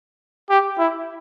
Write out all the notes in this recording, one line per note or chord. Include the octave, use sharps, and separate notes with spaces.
G4
E4